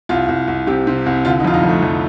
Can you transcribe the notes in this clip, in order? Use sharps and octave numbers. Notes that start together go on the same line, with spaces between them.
C2 F4
C2
C2
C3 G4
C3
C2
D3 F4
D#4
F2 F4
D#4
F2
A3
F2